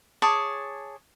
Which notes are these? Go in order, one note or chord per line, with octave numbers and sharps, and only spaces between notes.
G#4 C#5 A5 D6